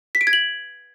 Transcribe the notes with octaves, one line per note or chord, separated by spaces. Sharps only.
B6
D7
G#6
F#7